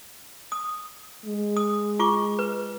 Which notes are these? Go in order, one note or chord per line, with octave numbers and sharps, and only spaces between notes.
D#6
G#3
D#6
F4 C#6 D6
B4